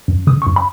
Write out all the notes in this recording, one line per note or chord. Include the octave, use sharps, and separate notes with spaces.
F#2
C#3 D#6
C#6
F#2
B5